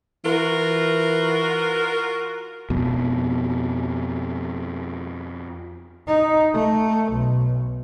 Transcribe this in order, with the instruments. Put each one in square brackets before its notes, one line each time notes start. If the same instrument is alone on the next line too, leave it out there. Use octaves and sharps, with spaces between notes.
[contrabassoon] E3 [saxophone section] F4 F#4 A#4
[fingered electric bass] F2 B2
[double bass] D#4
A3
B1